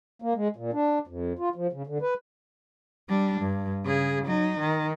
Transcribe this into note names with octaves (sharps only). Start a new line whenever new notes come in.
A#3
G#3
A#2
D4
F2
F4
F3
C#3
D3
B4
G3 D4
G2
C#3 G#4
F#3 D#4
D#3